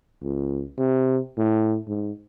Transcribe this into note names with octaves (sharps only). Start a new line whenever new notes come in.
C#2
C3
A2
G#2